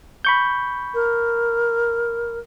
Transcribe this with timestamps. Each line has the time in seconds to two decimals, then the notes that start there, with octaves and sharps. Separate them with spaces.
0.25 B5 C#6 G6
0.94 A#4